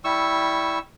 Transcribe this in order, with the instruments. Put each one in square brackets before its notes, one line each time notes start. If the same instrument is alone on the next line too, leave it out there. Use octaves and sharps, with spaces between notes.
[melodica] G3 E4 C#6 E6